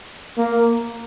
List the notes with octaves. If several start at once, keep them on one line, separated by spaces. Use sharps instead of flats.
A#3